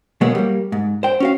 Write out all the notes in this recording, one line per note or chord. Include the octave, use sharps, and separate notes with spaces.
B2 F#3 G#3 A#3 B3
G3 A#3
G#2
C5 G5
C#4 F#4 F5